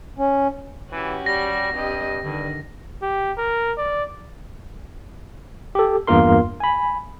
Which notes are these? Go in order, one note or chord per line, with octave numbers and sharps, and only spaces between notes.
C#4
E3 C#4 F#4 G4
G3 A#6
G2 C4 G4 D#5
G2 D3 D#3
G4
A#4
D5
G4 A4
E2 G2 A#3 F4 A#4 C6
G#5 B5